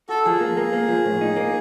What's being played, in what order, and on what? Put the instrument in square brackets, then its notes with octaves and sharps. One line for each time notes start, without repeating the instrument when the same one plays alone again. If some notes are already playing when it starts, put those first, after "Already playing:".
[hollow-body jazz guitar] F#4 [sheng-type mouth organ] A4
[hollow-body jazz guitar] F3 [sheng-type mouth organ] G#4
[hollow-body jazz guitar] A#3
A#3
A#3
F3
A2
D#4
A#3